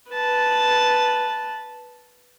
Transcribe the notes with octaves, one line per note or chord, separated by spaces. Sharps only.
B4 A5